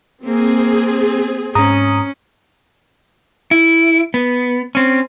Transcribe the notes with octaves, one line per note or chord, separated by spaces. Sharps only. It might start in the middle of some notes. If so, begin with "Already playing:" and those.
A#3 C4 G#4
G#2 C#4 A#5 D#6
E4
B3
C4 C#4